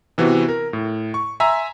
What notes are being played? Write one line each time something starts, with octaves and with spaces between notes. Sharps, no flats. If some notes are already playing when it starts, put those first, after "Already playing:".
C3 E3 B3 F#4
A#4
A2
C#6
E5 G#5 A#5 C6 E6